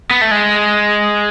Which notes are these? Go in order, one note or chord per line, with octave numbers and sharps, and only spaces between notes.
B3
A3
G#3